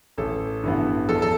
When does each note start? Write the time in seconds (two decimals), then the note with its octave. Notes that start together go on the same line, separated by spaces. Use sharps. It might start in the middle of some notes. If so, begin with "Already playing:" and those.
0.18 A1 A4
0.63 G2 E3 B3
1.09 E2 A4
1.22 A4